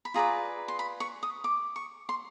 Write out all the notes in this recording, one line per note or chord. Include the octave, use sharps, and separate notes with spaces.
B5
F4 G#4 B4 D5 A#5
C6
B5
C#6
D#6
D6
C#6
C6